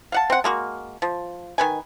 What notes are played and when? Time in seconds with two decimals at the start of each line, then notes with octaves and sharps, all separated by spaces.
0.12 F5 F#5 A5
0.30 C4 F#5
0.44 G#3 A#3 F#4
1.02 F3
1.58 D#3 B4 G#5